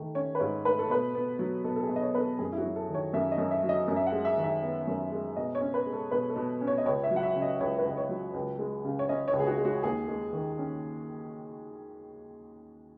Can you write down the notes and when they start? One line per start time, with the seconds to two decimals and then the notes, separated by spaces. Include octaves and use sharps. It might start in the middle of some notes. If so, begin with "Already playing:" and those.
Already playing: D#3 A3
0.15 C#4 C#5
0.35 B4
0.40 G#2 C#5
0.65 A3 B4
0.79 A4
0.90 B2 B4
1.15 B3
1.39 F#3
1.64 B2 A4
1.76 A4
1.83 G#4
1.89 B2
1.96 D#5
2.02 C#5
2.15 B3 B4
2.20 A4
2.39 F#2 G#4
2.52 E4
2.58 F#4
2.64 F#3
2.76 A4
2.89 D#3
2.94 C#5
3.13 F#2 E5
3.32 D#5
3.38 F#2
3.51 E5
3.63 F#3
3.69 D#5
3.88 F#2
3.96 E5
4.07 F#5
4.12 G#3
4.25 E5
4.37 D#3
4.44 E5
4.62 B3
4.87 F#2
5.12 G#3
5.36 B2 D#5
5.55 C#5
5.61 C#4
5.74 B4
5.86 G#3
5.93 A4
6.11 B2 B4
6.30 A4
6.36 B2
6.61 C#4
6.67 C#5
6.78 D#5
6.85 C#2 C#5
7.04 E5
7.11 F#3
7.16 F#5
7.23 E5
7.36 C#3
7.42 D#5
7.60 C#2 C#5
7.79 B4
7.85 C#2
7.92 D#5
7.97 C#5
8.09 F#3
8.34 C#2
8.59 G#3
8.85 C#3
8.99 C#5
9.09 C#4 D#5
9.28 C#5
9.33 C#2
9.40 G#4
9.47 F#4
9.58 G#3
9.65 F#4
9.83 D#2 G#4
10.08 G#3
10.33 D#3
10.58 C#4